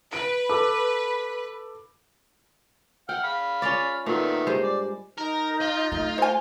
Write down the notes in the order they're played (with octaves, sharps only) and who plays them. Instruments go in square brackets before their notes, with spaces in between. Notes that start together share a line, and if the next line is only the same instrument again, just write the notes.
[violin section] B4 [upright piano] D7
[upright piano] A4 D6
[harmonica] F#5 F6 [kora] G5
[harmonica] F5 B5
[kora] C#4 F4 D5
[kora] A#2 [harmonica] D#3 A3 B3
[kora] G2 G#3 C5
[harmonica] D5
[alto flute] D#4 [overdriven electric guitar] A#4
[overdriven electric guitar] F4
[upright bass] A3
[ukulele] C5 G#5